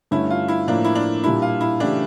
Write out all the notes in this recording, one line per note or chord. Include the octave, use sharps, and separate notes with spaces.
G2 D3 A3 C#4 E4
F4
E4
A2 F3 A#3 D4
E4
D4
A#2 G3 D4 E4
F4
E4
C#3 E3 A3 D4 E4 G4